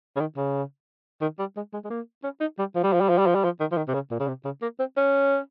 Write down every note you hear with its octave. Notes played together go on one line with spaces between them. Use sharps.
C#3
D#3
C#3
D#3
G3
G#3
G#3
G#3
A#3
C#4
D#4
G3
F3
G3
F3
G3
F3
G3
F3
G3
F3
D#3
F3
D#3
C3
C#3
A#2
C#3
C3
C#3
A#3
C4
C#4